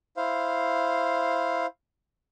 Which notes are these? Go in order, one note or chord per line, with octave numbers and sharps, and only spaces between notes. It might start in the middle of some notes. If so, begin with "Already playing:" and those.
E4 C5 F5